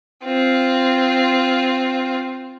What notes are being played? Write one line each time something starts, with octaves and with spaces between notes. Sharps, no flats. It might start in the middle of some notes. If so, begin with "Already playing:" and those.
C4 F4